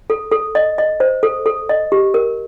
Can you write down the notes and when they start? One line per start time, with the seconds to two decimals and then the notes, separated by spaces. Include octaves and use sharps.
0.10 A4
0.31 A4
0.55 D#5
0.78 D#5
1.00 C5
1.23 A4
1.46 A4
1.69 D#5
1.92 G4
2.14 A#4